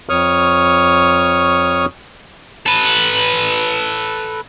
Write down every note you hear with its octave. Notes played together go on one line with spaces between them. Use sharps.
F2 C#5 C#6 D#6 F6
A4 B4